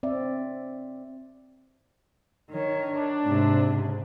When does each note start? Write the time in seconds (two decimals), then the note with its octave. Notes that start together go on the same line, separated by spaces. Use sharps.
0.03 C4 D5 E5
2.51 D#3 C#5
2.81 D4
3.24 G#2 C3
3.64 C#3